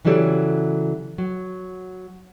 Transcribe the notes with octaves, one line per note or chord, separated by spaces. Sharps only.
C#3 E3 F#3 G3 A4 C#5
F#3